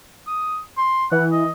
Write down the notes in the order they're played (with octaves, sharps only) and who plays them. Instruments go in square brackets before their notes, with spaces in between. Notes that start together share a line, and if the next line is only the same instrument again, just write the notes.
[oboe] D#6
C6
[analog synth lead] E3 [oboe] F#5
[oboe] D#5